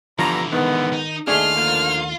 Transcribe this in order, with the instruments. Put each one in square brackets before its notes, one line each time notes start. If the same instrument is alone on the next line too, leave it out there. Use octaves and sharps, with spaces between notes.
[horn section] G2 B3 A#5 [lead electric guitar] D3 E3 [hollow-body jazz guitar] F3
[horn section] G#2 B3 [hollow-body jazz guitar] D#3
[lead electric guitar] D#4
[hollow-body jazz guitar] D#2 A3 D4 [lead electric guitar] F4 [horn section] G#4 [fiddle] F6
[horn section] D3 F3 A#3